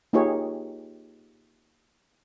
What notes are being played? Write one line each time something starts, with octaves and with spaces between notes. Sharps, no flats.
A#3 D#4 F4 G4 G#4 C#5